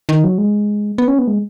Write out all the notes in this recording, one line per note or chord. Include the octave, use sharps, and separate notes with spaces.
D#3
F#3
G#3
B3
C#4
B3
G#3